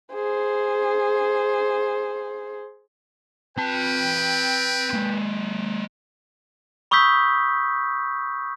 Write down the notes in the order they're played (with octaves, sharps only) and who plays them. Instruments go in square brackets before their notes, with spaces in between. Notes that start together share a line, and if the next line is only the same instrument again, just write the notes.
[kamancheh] G#4 C5
[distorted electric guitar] C4 A5 [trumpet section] B4 G5
[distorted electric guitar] G#3 A#3
[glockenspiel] B5 C#6 D#6 E6 G6 B6